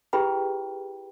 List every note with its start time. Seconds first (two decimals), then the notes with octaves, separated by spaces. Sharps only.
0.13 E4 G4 G#4 B4 G5 B5